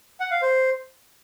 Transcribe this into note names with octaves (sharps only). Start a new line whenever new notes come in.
F#5
F5
C5